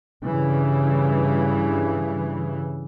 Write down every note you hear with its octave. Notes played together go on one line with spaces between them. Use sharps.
G2 C#3 E3